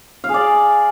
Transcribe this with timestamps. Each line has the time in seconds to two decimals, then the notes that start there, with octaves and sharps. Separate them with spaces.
0.24 F5
0.29 G#4
0.34 D5